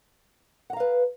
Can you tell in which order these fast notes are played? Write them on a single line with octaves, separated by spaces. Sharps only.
F#5 A#5 F5 B4